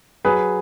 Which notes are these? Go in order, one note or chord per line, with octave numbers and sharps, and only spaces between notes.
F#3 G#4 B4